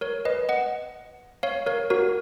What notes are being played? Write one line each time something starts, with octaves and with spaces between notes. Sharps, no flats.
A#4 C#5
B4 D#5
D#5 F#5
C#5 F5
A#4 C#5
F#4 A#4